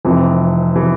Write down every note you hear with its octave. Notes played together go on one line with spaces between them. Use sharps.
F1 F2 E3
E3